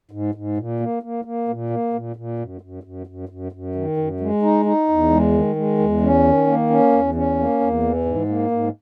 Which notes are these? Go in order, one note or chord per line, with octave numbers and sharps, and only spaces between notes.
G#2
G#2
A#2
A#3
A#3
A#3
A#2
A#3
A#2
A#2
F#2
F#2
F#2
F#2
F#2
F#2
D#3
F#2
G#3
D#4
D#4
E2
G#3
D#3
G#3
E2
C#4
D#3
A#3
C#4
E2
C#4
A#3
E2
E3
G#2
A#3
G#2